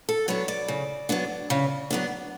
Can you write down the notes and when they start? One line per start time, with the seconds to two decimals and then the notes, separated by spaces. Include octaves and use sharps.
0.09 A4
0.28 F#3 B3 D4 C#5
0.48 D5
0.68 C#3
1.09 F#3 B3 D4
1.50 C#3
1.91 F#3 B3 D4